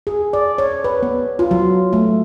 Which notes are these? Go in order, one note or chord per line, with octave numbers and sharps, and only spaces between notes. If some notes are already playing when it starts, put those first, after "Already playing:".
G#4
D5
C#5
B4
B3
F4
F#3
A3